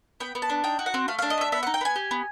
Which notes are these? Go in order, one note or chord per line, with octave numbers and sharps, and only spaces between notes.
B3 G5
B3
A5
D4
D#4 G5
F#4
F#5
C4
A3 F5
D4 F5
D#5
A3 E5
B3 E5
D#4 F#5
G5
B3 G#5
G4
B3